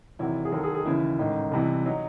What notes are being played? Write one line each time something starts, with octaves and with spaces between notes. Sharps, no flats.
E2 C3 D#3 F#3 E4
G#4
D#2 D#3 F#3 A4
G#4
G#4
D#2 C#3 E3 E4
A1 G#2 D#3 D#4
C2 C3 E3
F#3 D#4